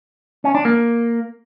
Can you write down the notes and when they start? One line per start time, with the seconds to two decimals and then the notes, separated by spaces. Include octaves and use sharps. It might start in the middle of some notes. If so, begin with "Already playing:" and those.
0.44 C#4
0.55 D4
0.65 A#3